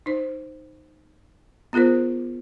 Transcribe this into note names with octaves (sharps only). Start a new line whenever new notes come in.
D#4 C5
B3 F4 G#4 A#4 C5